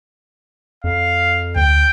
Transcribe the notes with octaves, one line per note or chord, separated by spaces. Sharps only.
F2 F5
D2 G5